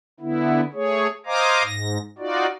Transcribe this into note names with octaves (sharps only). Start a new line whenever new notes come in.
D3 B3 E4
A3 G#4 C#5
C5 D#5 F5 G#5 A#5 D6
G#2 A#6
D#4 F4 F#4 D5